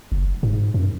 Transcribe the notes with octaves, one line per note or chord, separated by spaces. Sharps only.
F#1
G#2
F#2